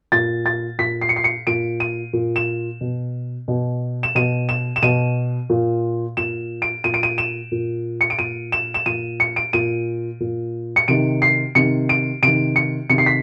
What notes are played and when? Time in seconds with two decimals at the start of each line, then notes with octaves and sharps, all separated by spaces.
0.12 A#2 A6
0.46 A6
0.78 A#2 B6
1.01 C7
1.09 C#7
1.16 C7
1.24 C#7
1.47 A#2 D7
1.80 D#7
2.13 A#2
2.36 E7
2.81 B2
3.48 B2
4.03 E7
4.15 B2 D#7
4.49 E7
4.76 E7
4.83 B2 D#7
5.50 A#2
6.17 A#2 E7
6.62 D7
6.84 A#2 D#7
6.94 D7
7.03 D#7
7.18 E7
7.52 A#2
8.01 C#7
8.10 D7
8.18 A#2 D#7
8.52 E7
8.74 E7
8.86 A#2 D#7
9.20 C#7
9.36 D7
9.53 A#2 D#7
10.20 A#2
10.76 C#7
10.88 C3 D#3 D7
11.22 C7
11.55 C3 D#3 C#7
11.89 D7
12.23 C3 D#3 D7
12.56 C#7
12.89 C3 D#3 C#7
12.98 C7
13.06 B6